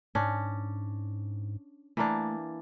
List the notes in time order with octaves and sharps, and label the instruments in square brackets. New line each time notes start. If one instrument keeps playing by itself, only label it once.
[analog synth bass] G#2 [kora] C#4 D4
[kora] E3 A#3 D4 [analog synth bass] A3